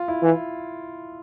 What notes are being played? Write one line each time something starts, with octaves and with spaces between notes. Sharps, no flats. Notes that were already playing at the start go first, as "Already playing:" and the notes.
Already playing: F4
E4
E3